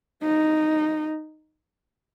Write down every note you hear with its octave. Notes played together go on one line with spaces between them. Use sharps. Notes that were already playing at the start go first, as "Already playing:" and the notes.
D#4